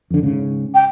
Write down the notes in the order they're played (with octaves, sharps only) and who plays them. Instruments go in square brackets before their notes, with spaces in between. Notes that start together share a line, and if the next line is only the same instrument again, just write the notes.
[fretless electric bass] F2 D3
G#2 C#3
[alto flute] G5